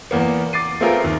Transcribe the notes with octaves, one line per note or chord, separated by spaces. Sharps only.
E2 A#3 B3
D6 A6 C7 D#7
A3 B3 C4 F4 G#4 A#4
D#2